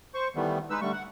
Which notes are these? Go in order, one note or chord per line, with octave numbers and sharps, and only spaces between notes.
C5 C#6
D#3 E3 G3 A3 B3
G#3 D#4 B4 E6
D3 G3 A3 C#6
F#5